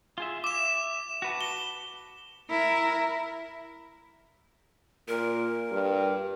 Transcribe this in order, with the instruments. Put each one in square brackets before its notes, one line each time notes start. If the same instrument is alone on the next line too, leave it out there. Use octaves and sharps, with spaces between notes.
[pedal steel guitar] F4 G#4 E5
[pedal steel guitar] E5 [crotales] D6 E7
[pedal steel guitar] F#4 B4 A5
[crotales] G7
[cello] E4 A#4
[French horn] A#2 [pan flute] A#4
[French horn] G2